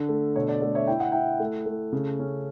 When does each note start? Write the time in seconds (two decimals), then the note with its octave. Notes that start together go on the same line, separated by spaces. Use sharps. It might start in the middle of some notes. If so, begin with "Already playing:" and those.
Already playing: D3
0.09 A3
0.36 B2 C#5
0.49 D5
0.61 A3 D5
0.75 C#5 E5
0.87 E4 G5
1.00 F#5
1.12 E4 E5 G5
1.40 A3
1.66 A3
1.92 C#3
2.19 C#4